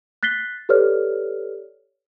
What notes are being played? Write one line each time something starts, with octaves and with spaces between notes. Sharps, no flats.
F#6 A6 B6 C7 G7
G4 A4 B4 C#5 D5 F6